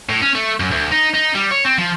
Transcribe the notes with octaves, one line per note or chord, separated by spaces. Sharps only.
A2
C#4
A3
F#2
D2
D#4
D#4
G3
C#5
C4
F3